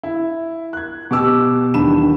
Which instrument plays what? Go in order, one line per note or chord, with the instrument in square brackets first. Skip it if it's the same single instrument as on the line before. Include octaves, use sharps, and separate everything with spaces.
[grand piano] E4
F#6 G#6
B2 G4 D6 E6
D#1 D#3 E3 D4 B5 E7